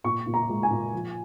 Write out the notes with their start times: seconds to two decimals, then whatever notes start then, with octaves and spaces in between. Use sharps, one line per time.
0.04 A#2 C#6
0.26 A#2
0.34 A#5
0.49 G#3
0.63 G#5
0.71 A#2
0.93 F3